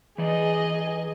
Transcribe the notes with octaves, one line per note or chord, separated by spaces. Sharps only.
E3 G#4 D5 D#5